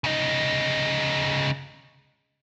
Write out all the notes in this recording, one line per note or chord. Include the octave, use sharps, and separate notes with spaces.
C#3 D#4